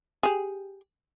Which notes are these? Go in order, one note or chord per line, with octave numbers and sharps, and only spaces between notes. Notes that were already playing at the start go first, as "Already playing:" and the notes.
G4 G#4